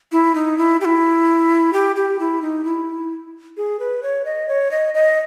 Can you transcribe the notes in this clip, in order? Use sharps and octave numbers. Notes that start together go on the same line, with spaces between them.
E4
D#4
E4
G4
E4
G4
G4
E4
D#4
E4
G#4
B4
C#5
D#5
C#5
D#5
D#5